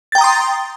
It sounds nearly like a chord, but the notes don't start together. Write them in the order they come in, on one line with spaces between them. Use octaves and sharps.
A6 G5 A#5 D#6 C6